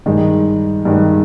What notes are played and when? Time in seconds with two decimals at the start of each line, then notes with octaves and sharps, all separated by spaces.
0.06 G2 D#3 G#3
0.85 G2 D#3 G#3